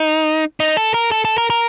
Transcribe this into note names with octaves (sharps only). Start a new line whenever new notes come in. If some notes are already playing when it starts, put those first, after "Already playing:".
Already playing: D#4
D#4
A4
A#4
A4
A4
A#4
A#4